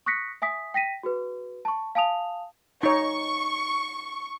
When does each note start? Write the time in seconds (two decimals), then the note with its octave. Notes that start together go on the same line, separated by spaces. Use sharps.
0.06 C#6 D#6 F#6 A#6 B6 C#7
0.42 E5 G#5 D#6 B6
0.74 G5 A#6 B6 D#7
1.03 F#4 G#4 B4
1.65 A5 C#6
1.95 F5 G#5 A5 D#6 F7
2.83 D#4 C#5 C#6